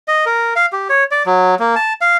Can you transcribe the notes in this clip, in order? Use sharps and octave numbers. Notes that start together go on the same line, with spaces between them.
D#5
A#4
F5
G4
C#5
D5
F#3
A#3
A5
F5